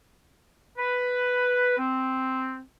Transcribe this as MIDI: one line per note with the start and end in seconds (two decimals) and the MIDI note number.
0.78 1.75 71
1.78 2.62 60